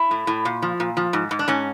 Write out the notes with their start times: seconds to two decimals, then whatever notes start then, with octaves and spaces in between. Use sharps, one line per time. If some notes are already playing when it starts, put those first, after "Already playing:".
Already playing: E4
0.11 A2
0.27 A2
0.45 A#2
0.62 F3
0.80 A#2
0.97 F3
1.13 G#2
1.31 G#2
1.39 D4
1.48 G#2 C#4